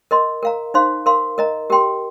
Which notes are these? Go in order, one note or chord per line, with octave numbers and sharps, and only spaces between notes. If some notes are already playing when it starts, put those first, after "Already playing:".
A#4 D#5 C6
A#4 F5 A#5
D#4 C5 F5 C6
A#4 F5 C6
A#4 D#5 A#5
G4 A#4 G5 C6